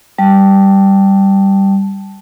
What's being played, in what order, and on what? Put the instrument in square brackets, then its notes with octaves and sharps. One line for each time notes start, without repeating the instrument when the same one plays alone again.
[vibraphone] G3 A5